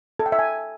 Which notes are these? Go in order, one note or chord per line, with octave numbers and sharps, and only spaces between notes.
A4
G5
E5
G#5